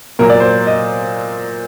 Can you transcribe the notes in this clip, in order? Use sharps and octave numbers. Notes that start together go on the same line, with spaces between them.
A#2 F#3 A#4
D5
C5
D#5